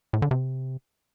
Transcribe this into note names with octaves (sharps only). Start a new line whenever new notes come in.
A2
D3
C3